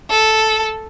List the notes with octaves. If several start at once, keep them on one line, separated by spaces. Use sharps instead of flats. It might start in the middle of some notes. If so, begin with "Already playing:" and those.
A4